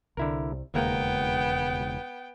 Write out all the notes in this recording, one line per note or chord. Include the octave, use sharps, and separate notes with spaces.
C2 D3 E4 A#4
E1 D#2 C#3 G#3 A#3 B3 A#4 G5